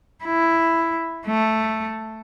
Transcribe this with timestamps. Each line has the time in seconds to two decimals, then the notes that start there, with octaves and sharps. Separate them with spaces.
0.25 E4
1.26 A3